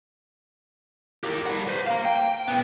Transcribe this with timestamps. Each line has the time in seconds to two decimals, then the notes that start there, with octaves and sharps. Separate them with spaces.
1.24 G4 A#4
1.46 G3 F#5
1.67 B4 C5
1.86 F5 A#5
2.05 G5
2.48 A#2 B3